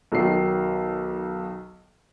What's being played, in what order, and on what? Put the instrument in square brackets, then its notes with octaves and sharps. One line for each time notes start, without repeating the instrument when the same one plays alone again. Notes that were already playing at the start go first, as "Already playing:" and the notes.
[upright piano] B1 D#3 F#3 C7